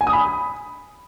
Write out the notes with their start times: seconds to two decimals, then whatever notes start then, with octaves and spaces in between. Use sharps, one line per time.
0.01 G#5
0.07 D#6
0.13 B5